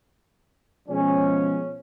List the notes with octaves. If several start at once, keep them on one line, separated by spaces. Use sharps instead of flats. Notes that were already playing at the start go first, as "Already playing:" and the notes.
B2 F3 G#3 C#4